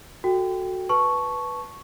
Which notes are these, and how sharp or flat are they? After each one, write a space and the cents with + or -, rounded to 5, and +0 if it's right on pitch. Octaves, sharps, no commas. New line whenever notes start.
F#4 +0 A4 +0 G5 +0
B4 +0 A5 -10 C#6 +0